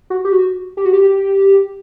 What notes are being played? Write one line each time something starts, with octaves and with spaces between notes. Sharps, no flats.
F#4
G4
F#4
G4
F#4
G4